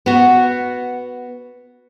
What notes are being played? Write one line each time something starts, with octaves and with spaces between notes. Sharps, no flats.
B3 F#4